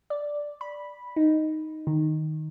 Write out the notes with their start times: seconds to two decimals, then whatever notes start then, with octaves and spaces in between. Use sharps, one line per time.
0.10 D5
0.61 B5
1.16 D#4
1.87 D#3